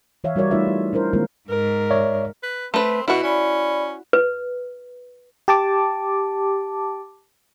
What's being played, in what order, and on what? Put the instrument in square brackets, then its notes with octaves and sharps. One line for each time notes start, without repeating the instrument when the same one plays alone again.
[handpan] E3 C#5 E5 F5
G3 F#4 A#4 C#5 D5
G3 A3 D#4 F4 B4 E5
E4
D4 E4 A#4 C5
D#3 G#3 A#3 C4 F4 A#4
[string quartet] G#2 [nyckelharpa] A#4
[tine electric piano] C#5 D5 E5
[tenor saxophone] B4
[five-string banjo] A3 B4 [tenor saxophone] C4
[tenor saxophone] B2 [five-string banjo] E4 F#4
[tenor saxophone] C#4 [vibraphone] D5 B5
[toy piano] B4
[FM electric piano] G4 A5 D6